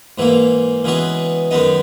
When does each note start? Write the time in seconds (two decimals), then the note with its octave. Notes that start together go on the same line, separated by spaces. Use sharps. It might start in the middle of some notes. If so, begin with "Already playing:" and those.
0.18 G#2 E3 A#3
0.84 C#3 E3 G#3 B3 F#4
1.51 F#2 D#3 G#3 B3 D#4